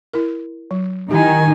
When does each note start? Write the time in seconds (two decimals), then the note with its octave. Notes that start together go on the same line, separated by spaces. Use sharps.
0.14 E4 A#4
0.71 F#3
1.11 D#3 D#4 E4 G4 G#5